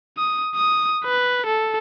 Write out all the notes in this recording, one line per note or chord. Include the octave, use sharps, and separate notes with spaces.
D#6
D#6
B4
A4